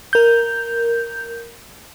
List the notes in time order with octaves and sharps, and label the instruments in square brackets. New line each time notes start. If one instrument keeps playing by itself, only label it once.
[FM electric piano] A#4 G6